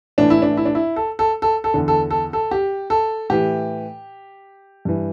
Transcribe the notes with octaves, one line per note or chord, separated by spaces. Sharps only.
A2 E3 D4
E4
D4
E4
D4
E4
A4
A4
A4
A4
E2 D3
A4
A4
A4
G4
A4
A2 E3 G4
G2 E3